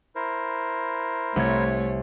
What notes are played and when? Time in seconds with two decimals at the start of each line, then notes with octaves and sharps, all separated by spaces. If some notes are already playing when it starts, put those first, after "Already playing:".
0.16 E4 A#4 C5
1.36 C2 A3 C#5 G#6